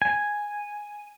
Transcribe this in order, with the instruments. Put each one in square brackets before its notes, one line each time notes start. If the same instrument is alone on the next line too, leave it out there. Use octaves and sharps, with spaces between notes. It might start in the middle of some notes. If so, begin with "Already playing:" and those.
[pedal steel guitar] G#5